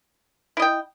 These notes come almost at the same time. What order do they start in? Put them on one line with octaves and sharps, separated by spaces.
E4 D#5 G5